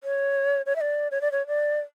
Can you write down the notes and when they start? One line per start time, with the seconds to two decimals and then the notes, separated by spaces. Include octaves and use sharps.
0.04 C#5
0.66 C#5
0.76 E5
0.81 D5
1.11 C#5
1.21 D5
1.32 C#5
1.47 D5